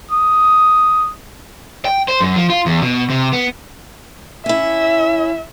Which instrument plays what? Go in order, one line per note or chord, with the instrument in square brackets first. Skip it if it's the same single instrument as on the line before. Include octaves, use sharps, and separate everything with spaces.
[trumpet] D#6
[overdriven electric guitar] G5
C5
F#2
F3
F4
E2
B2
C3
B3
[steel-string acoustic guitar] C#4 E4 [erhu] E5